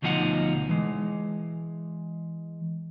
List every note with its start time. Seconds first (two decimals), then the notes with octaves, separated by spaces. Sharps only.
0.02 D2 B2 F3 D#4 G#4 F#5
0.69 E3 G#3